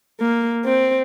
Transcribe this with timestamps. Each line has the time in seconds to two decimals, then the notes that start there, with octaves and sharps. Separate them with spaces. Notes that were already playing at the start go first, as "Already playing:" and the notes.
0.20 A#3
0.65 C4